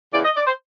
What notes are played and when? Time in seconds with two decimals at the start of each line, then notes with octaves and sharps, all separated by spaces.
0.13 E2 C#3 E3 D5
0.24 D#5
0.36 D5
0.47 C5